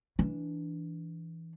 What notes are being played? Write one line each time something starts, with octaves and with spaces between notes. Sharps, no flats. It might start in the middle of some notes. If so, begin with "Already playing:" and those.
E3 D4